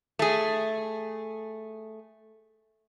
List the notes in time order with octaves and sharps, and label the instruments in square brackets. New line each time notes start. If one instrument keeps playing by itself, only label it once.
[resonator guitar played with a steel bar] A3 G#4